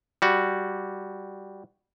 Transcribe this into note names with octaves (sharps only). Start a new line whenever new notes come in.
G3 F#4